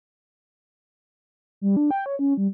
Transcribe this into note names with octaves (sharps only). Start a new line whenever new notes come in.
G3
D4
G5
C#5
C#4
G3